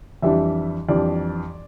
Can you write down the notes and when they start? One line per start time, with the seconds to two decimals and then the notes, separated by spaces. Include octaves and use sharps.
0.22 F2 E3 G3 D4 E5
0.88 F2 E3 G3 D4 D5